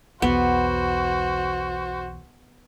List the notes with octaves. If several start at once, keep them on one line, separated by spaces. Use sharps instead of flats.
B1 E2 B3 F#4 C5